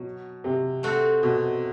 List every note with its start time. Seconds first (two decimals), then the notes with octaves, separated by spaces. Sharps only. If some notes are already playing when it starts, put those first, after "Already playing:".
Already playing: B2 F#3
0.44 C3
0.83 A3 C4 F#4 A4
1.23 B2